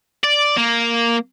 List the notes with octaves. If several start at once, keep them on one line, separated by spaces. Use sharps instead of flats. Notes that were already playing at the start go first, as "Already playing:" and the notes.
D5
A#3